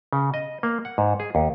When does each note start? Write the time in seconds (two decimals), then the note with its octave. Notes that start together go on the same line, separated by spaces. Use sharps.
0.13 C#3
0.34 D#5
0.63 A#3
0.85 F#5
0.98 G#2
1.20 G#4
1.35 D#2